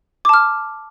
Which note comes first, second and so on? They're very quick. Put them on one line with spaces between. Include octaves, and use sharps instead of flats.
D6 A5 F6